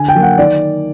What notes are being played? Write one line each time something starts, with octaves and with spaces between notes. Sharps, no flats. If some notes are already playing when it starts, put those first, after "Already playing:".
Already playing: D3 G#5
G5
F#3 A#3
F#5
D#3 D5